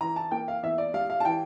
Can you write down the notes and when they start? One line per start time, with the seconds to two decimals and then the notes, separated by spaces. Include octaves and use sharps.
0.01 E3 A#5
0.16 A5
0.31 A#3 G5
0.48 F5
0.63 E2 E5
0.78 D5
0.94 G3 F5
1.10 F5
1.20 A5
1.25 E3 G5